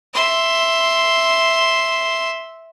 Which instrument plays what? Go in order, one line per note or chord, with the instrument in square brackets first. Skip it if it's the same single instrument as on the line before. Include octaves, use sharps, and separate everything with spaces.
[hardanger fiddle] E5 C6